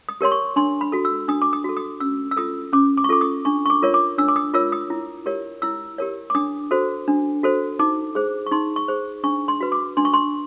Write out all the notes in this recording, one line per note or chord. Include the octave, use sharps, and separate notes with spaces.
D#6
G4 A#4 C#5 C6
C#6
D4 C6
B5
F#4 A4
E6
D4 D#6
D6
D#6
F#4 A4
D#6
C#4 E6
E6
F4 A4 D#6
C#4 D6
D6
C#6
F4 A4 D6
D#6
D4 C#6
C#6
D6
F4 A#4 C#5
D6
D4 E6
D6
D#6
F4 A#4 C#5 E6
D#6
E4
G4 A#4 C#5
E4 E6
G4 A#4 C#5
D6
D4 D#6
F#4 A4 C5
D4
F#4 A4 C5
D#4 D6
G#4 C5
C#6
D#4 C6
C#6
G#4 C5
D4 C#6
C6
F#4 B4
D6
D4 C6
C#6
C6